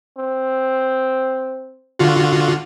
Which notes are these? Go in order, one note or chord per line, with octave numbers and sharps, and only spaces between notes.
C4
D3 F4 F#4